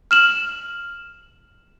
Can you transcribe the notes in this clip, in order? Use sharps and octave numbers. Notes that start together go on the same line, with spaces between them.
F6 E7 F#7